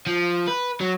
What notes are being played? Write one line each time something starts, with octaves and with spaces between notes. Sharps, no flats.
F3
B4
F#3